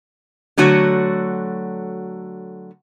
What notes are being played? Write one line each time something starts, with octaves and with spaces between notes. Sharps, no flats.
D3 F#3 A3 F#4 C#5